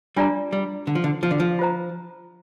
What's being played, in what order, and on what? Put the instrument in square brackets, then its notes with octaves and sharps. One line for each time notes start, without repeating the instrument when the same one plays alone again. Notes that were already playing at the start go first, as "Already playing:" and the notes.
[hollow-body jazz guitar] G3 [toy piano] D4 F4 D5 A#5
[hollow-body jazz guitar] G3
D3
F3
D3
F3
D3
F3
[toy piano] F4 C5 A#5